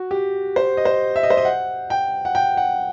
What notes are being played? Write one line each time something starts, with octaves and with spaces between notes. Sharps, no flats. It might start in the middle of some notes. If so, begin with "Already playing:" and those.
Already playing: F#4
G4
C5
D#5
C5
E5
D#5
C5
D#5
F#5
G5
F#5
G5
F#5